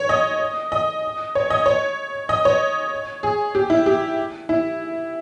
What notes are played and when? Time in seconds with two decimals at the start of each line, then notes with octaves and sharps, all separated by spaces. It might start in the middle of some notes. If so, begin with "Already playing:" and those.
Already playing: C#5
0.09 D#5
0.72 D#5
1.35 C#5
1.50 D#5
1.66 C#5
2.29 D#5
2.45 C#5
3.23 G#4
3.55 G4
3.70 E4
3.86 G4
4.49 E4